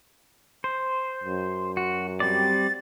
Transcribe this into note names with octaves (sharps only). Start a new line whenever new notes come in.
C5
F#2
F#4
G3 C4 D5 A6